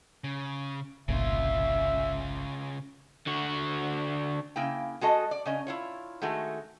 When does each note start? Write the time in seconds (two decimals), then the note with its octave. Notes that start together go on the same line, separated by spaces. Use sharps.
0.24 C#3
1.08 G1 C2 A#2 C#3 F4 E5
3.26 D3 F#4
4.56 C#3 A#3 E4 G5
5.01 G#3 F#4 A4 D#5
5.31 D5
5.46 C#3 C#4 D#5
5.67 E4 F4 C#5
6.22 D#3 G#3 A3 F#4